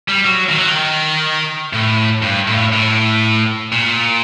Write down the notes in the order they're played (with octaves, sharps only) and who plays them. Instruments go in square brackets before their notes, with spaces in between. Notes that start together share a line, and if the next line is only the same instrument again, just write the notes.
[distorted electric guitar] G3
F#3
D#3
F#3
D#3
A2
G2
A2
A2
A#2